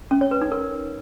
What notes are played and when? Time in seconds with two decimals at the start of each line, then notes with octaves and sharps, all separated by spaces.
0.11 C#4
0.21 C#5
0.31 B4
0.41 D#4
0.52 A#4